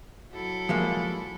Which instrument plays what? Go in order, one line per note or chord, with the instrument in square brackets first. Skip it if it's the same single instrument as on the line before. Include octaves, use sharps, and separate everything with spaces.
[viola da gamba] F#3 E4 A4
[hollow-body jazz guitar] F3 G#3 A#3